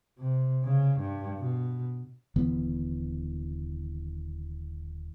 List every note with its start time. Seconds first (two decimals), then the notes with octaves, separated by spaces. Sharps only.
0.19 C3
0.65 C#3
1.01 G2
1.38 B2
2.36 D#1 D3 E3 B3